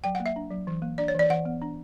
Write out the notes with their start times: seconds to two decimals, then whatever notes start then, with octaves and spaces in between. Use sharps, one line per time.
0.04 F#3 G5
0.15 F#5
0.20 A#3
0.26 E5
0.36 D4
0.51 F#3
0.67 E3
0.82 A#3
0.98 D4 D5
1.08 C#5
1.14 E3 D5
1.30 E3 F#5
1.45 B3
1.62 D4